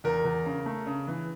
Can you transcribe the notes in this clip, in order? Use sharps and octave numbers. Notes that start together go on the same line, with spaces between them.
E2 A#4
E2
C#3
A3
C#3
E3